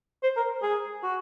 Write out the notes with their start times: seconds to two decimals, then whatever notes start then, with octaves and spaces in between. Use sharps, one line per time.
0.23 C5
0.37 A#4
0.63 G#4
1.03 F#4